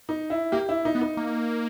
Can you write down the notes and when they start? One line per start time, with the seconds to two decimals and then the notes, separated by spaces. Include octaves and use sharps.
0.09 D#4
0.30 E4
0.52 A#3 G4
0.69 E4
0.85 D#4
0.95 B3
1.01 D#4
1.17 A#3